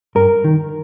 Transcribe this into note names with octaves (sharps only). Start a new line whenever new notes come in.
G2 A#4
D#3